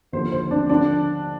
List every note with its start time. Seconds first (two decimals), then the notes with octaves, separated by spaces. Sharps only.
0.13 D#2 D3 F3 C5
0.32 C5
0.51 D4
0.69 D3 F3 D4